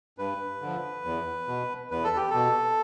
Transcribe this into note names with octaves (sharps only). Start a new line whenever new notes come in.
G2 B4
D3 F3
E2
B2
E2 B4
A4
G4
B2 A4